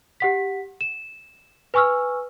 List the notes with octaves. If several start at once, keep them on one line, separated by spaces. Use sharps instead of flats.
G4 F#5 B6
E7
B4 G#5 C#6 E6 F6